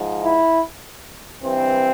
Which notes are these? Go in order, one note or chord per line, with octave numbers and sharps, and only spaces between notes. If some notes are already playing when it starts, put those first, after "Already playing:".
Already playing: G#2 F3
E4
G2 E3 C4